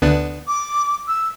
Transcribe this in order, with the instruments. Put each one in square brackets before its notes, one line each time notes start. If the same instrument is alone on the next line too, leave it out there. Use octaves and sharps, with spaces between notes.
[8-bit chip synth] D2 B3 D4
[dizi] D6
E6